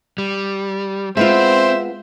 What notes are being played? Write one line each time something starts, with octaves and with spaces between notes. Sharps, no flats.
G3
G#3 B3 C4 F4 C5 E5